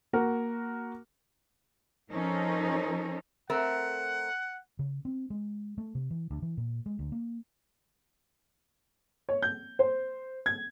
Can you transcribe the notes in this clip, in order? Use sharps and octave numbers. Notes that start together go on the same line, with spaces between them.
A#3 F#4 A#4
F3 C#4 D#4 A4 A#4 C5
A3 C4 A#4 F#5
C#3
C4
G#3
A3
C3
E3
D2
E3
A#2
G#3
D2
A#3
C#5
G6
C5
G#6